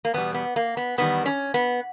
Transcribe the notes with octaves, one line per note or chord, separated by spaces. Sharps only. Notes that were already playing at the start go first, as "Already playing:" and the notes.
A#3
E2 B2 G3 B3
B3
A#3
B3
E2 D#3 G3 B3
C#4
B3